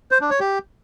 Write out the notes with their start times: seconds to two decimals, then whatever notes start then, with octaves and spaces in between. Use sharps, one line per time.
0.11 C5
0.21 D4
0.31 C#5
0.40 G4